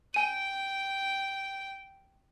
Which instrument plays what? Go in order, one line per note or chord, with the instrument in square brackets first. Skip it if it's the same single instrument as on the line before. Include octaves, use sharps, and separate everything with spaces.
[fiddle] G5 [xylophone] G#5 D#7